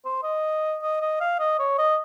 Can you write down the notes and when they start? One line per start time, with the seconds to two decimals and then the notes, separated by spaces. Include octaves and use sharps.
0.05 C5
0.23 D#5
0.82 D#5
1.01 D#5
1.20 F5
1.39 D#5
1.59 C#5
1.78 D#5